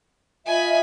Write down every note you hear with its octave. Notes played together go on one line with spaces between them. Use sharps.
F4 D#5 E5 G#5 B5